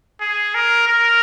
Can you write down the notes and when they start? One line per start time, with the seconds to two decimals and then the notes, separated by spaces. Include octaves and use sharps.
0.21 G#4
0.55 A#4
0.88 A#4